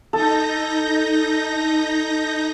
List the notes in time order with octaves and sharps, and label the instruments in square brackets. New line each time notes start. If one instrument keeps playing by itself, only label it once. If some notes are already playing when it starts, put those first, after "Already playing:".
[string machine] D#4 G6 A#6 [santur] A4